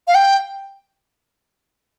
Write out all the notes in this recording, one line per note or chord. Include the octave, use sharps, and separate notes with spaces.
F5
G5